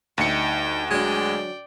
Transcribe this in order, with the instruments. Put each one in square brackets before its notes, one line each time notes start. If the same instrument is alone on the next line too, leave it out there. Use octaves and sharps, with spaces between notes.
[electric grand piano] D2 C#7 [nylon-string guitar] G3 D#4 E5 [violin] G5
[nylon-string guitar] F#3 D4 [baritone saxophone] G#3 [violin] D5 G5